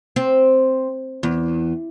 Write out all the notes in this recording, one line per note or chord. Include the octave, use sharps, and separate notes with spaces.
C4
E2